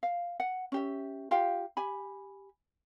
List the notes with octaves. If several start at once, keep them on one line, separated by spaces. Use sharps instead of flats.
F5
F#5
C#4 G4 E5
F4 G4 F5 G5
G4 G#5 B5